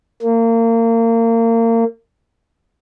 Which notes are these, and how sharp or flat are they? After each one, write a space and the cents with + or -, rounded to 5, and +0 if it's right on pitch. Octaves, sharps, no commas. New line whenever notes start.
A#3 -30